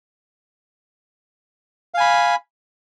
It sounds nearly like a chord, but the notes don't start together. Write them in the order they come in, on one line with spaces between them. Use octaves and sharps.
F5 G#5 B5